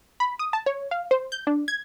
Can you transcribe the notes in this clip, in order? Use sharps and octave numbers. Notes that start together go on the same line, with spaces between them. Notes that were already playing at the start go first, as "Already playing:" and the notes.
B5
D#6
A5
C#5
F5
C5
G6
D4
G#6